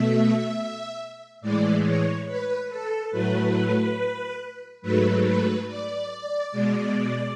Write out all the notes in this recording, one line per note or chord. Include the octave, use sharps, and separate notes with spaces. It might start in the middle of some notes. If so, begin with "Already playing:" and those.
Already playing: B2 A3 E5
A2 E3 G#3 D5
C#5
B4
A4
A2 F#3 A3 B4
G#2 F#3 A3 B4
B4
D5
B2 G#3